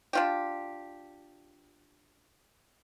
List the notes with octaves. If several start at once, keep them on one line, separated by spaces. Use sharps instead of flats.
D4 F4 G4